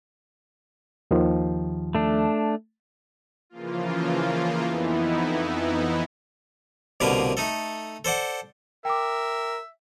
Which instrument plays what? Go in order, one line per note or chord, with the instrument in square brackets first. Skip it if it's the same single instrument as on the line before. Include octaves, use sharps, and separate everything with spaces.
[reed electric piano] D#2 D#3 F3
[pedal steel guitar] A3 D4
[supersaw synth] C#3 E3 F3 A#3 F4
F2 E3 B3 D#4 E4
[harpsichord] C2 B2 D3 A#3 B4 F5
A3 D#4 A4
A4 C5 D5 F#5
[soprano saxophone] A#4 [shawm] E5 [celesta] G5 D6